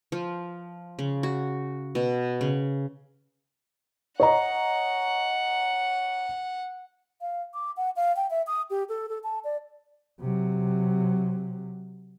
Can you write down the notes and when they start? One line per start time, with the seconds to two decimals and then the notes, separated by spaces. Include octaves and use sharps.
0.12 F3
0.99 C#3
1.23 F#4
1.95 B2
2.41 C#3
4.20 C#5 D#5 F#5 A#5
7.21 F5
7.54 D6
7.77 F#5
7.96 F5
8.16 G5
8.31 E5
8.47 D#6
8.70 G4
8.89 A4
9.09 A4
9.24 A5
9.44 D5
10.20 C3 F#3